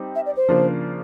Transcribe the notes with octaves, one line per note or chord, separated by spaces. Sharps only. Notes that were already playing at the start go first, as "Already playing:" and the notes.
Already playing: G3 C4 D#4
E5
D5
C5
C#3 F3 A#3 D4 F4